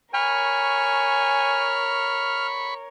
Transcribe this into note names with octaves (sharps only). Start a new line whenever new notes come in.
A#4 C#5 G#5 B5 C#6 F6